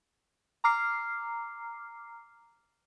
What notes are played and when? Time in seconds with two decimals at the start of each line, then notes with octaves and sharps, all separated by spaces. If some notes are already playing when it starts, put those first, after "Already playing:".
0.64 A#5 D6 F6 C7